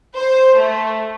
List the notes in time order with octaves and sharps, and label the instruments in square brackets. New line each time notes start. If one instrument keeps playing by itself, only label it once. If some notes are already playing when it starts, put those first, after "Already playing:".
[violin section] C5
A3